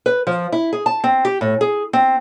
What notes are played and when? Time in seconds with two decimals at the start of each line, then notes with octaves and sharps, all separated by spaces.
0.06 B4
0.27 F3
0.52 E4
0.73 G#4
0.86 A5
1.04 C4
1.25 G4
1.41 A2
1.61 G#4
1.93 C4